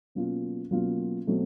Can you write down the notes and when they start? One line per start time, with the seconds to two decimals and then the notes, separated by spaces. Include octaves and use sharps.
0.15 B2 F#3 A#3 C#4 F4
0.71 B2 F#3 A#3 C#4 F4
1.27 B2 F#3 A3 C4